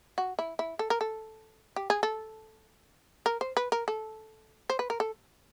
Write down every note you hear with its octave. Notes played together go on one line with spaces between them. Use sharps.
F#4
E4
E4
A4
A#4
A4
G4
G#4
A4
A#4
C5
B4
A#4
A4
C5
B4
A#4
A4